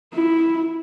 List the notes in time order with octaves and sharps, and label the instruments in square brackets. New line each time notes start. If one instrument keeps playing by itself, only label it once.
[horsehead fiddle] E4